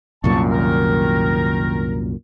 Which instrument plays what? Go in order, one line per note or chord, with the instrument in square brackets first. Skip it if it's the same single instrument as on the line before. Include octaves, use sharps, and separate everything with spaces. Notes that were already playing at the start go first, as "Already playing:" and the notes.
[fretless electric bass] C2 F#2 A#2 [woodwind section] A5 C#6
[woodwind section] D#3 A#4